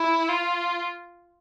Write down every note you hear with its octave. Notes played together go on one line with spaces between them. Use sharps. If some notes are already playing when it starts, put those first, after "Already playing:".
Already playing: E4
F4